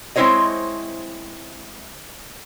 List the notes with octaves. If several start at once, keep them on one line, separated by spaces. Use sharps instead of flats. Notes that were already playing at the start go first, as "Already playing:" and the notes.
G#3 C4 E4 C5 C#5 D#5